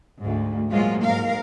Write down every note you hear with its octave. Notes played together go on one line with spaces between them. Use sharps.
D2 G#2
A#2 F3 F#3 G#3 F4
G#2 A#4 F5